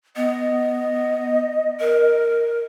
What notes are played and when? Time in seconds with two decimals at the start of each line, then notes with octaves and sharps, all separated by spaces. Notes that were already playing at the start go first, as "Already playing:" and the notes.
0.16 B3 D#5
1.80 A#4